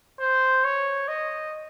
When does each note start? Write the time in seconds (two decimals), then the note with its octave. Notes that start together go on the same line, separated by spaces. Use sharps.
0.20 C5
0.64 C#5
1.08 D#5